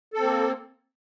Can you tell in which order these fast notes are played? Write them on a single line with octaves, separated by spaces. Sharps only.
A4 C4 A#3